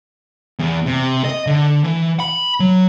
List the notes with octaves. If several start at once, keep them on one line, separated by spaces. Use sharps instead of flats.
E2
C3
D#5
D3
E3
B5
F#3